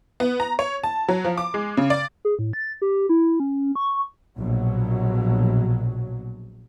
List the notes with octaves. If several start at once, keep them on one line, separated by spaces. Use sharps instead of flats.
B3
A#5
C#5
A5
F#3
F3
D6
G#3
C#3
D5
G#4
A2
A6
G4
E4
C#4
C#6
A#1 B2 F#3